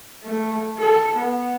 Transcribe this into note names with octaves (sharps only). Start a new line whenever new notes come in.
A3
A4
B3